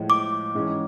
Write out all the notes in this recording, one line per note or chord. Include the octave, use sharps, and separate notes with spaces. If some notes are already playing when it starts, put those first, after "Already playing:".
Already playing: A2 F3 G#3
D6
G#2 E3 G#3 C#4